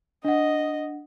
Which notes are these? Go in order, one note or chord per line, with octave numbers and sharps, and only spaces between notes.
D4 D#5 F#5